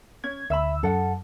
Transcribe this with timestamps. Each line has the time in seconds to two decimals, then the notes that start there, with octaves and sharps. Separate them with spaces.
0.24 C#4 G#6
0.50 D2 E5 B5 E6
0.83 F#2 A4 F#5